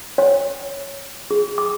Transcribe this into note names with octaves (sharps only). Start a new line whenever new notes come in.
C#5
G#4
D6